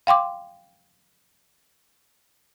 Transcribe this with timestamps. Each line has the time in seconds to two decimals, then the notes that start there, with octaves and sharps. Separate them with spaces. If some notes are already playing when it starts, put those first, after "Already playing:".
0.07 F5 G5 C6 D6